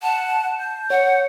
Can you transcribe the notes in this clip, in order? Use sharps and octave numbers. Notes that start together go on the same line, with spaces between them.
F#5 A5
G6
C#5 F#5